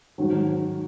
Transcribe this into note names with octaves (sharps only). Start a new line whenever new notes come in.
G#2 D#3 F#3